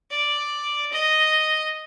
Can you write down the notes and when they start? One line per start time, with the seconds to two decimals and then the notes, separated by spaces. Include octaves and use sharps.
0.11 D5
0.92 D#5